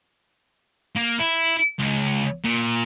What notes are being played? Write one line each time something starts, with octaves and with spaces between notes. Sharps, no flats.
A#3
E4
C#2
A#2